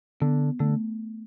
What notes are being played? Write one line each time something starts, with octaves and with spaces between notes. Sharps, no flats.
D3 B3
D3 A3